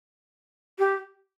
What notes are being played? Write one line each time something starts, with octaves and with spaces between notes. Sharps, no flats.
G4